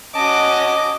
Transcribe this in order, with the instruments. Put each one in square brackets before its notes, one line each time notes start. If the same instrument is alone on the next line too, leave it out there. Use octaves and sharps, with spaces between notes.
[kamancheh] C#4 F#4 [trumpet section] D#5 [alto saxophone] A5 [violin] D6